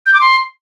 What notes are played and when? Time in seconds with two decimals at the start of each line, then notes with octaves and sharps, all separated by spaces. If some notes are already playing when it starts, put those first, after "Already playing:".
0.06 G6
0.14 D6
0.21 C6